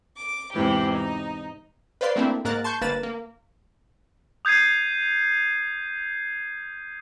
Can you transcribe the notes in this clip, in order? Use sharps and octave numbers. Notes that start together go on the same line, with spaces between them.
D6
E2 G#2 C3 E3 G4
D#4
B4 C5 D5 F5 C6
A3 A#3 C4 D4 E4
G#2 A#3 A#4 F#6 A6
A5 C6 C#6 G6
G1 A#3 B4 A6 E7
A#3
D#6 G6 G#6 C7 D#7